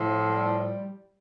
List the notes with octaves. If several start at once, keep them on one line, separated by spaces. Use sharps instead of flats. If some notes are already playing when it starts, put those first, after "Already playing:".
Already playing: A2 F3
G3